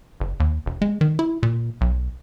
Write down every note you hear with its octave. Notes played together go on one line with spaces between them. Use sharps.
F#1
D#2
E1
G#3
D#3
E4
A#2
B1